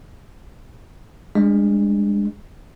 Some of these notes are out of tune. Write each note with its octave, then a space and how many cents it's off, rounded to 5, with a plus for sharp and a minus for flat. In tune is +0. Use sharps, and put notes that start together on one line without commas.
G#3 -30 D4 +0